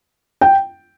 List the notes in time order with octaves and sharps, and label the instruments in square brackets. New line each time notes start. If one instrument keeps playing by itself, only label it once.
[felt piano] G5